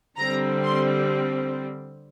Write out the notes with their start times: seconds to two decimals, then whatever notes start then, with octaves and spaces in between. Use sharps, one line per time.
0.17 D3 G3 C4 A#5
0.63 C6